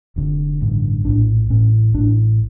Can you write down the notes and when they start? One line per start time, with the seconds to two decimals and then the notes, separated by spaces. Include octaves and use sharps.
0.16 F1 F2 D3
0.61 A1 G2 D3
1.05 A#1 A2 D4
1.50 A1 A2 C#4
1.94 A1 A2 D4